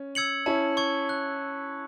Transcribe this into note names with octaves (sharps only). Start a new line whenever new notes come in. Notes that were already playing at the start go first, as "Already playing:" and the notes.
Already playing: C#4
E6 G#6 C#7 F#7
C#4 E4 A5
C#6 G#6
F#6